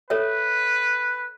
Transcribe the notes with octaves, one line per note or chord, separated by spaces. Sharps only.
A4 B4 C#5 E5